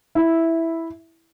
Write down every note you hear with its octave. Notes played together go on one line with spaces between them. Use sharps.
E4